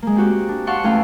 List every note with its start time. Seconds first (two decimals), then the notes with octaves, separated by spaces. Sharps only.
0.02 G#3 A#3
0.16 C4 F#4 G4
0.48 D4
0.67 D5 F5 F#5 A5 C6 C#6
0.83 E2 A3 C#4 F5 G5 B5